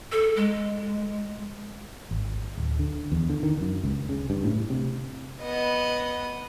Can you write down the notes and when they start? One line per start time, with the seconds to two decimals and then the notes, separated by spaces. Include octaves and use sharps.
0.12 A4
0.36 G#3
2.11 G#1
2.57 D1
2.79 D3
3.12 E2
3.29 D3
3.43 D#3
3.61 F#2
3.84 C#2
4.09 C#3
4.30 G2
4.44 A2
4.70 C3
5.42 B3 D#5